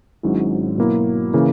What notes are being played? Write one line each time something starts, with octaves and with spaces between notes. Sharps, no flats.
G#1 G#2 F#3 C#4 E4
B2 F#3 A#3 E4
C#3 E3 A#3